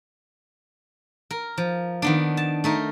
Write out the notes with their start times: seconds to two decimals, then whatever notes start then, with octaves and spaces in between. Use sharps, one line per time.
1.31 A#4
1.58 F3
2.02 D#3 B3 D4
2.37 A5
2.64 A3 D#4 A#4